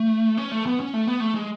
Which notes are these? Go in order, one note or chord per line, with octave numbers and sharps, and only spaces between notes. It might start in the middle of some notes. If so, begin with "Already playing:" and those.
Already playing: A3
C#4
A3
B3
C#4
A3
B3
A3
G#3